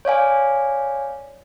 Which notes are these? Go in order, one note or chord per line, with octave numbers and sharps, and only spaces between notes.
C#5 D5 F5 G#5